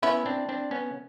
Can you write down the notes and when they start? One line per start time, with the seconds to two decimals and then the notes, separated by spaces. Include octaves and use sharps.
0.03 B3 C#4 E4
0.26 C4 D4
0.49 C4 D4
0.71 B3 C#4